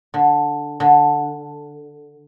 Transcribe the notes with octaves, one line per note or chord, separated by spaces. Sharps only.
D3
D3